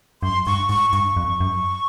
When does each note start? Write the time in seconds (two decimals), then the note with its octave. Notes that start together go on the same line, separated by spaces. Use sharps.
0.22 F#2 C6
0.46 G2 C#6
0.69 G#2 C#6
0.93 G2 C#6
1.17 F2
1.40 F#2